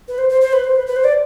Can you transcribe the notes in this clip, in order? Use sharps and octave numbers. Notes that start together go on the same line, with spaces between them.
B4
C5
C5
C5
B4
C5
B4
B4
C5
D5